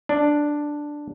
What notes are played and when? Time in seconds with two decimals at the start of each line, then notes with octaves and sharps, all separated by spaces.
0.09 D4